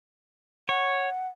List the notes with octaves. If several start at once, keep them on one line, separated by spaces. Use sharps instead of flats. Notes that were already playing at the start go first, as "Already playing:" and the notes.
C#5 F#5